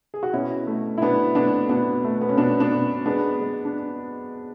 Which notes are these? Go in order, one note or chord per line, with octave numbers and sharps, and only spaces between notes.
G#4
F#4
B2 C#4 E4
A3
E4
B2 B3 D4
A3 B3 D4
B2 B3 D4
A3
B3
C#4
B2 B3 D4
B3 D4
B2
G#3 B3 D4
G#3
D4